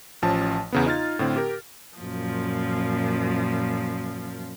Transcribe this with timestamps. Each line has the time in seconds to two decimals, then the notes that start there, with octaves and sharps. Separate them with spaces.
0.22 A1 F3 C#4 A5
0.73 E2 C#3 B3
0.86 D#4 F4 F6 G#6 A6
1.19 A2 D3 C4
1.36 G4 A#4
1.98 F#2 A#2 F3